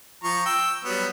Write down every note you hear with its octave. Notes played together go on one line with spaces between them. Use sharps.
F3 A#5 C#6
G5 E6
F#3 G3 B3